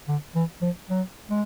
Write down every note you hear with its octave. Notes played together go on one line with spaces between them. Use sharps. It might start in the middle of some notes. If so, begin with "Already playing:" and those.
D3
E3
F3
F#3
G#3